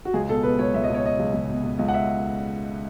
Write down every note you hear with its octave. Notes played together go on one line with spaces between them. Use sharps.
F#4
C#2 G#4
B2 A4
B2 B4
C#2 C#5
C#2 E5
D#5
B2
C#5
B2 D#5
C#2
C#2
B2
B2
C#2
F#5
E5